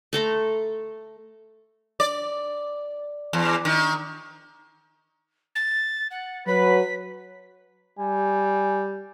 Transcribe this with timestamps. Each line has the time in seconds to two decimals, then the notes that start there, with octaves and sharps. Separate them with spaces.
0.13 A3 A4 A#5 C6
2.00 D5
3.33 E2
3.65 D#3
5.55 A6
6.11 F#5
6.47 F#3 B4 B6
7.99 G3 G#5